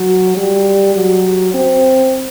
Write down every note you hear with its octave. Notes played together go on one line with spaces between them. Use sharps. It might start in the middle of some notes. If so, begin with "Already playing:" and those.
Already playing: F#3
G3
F#3
C4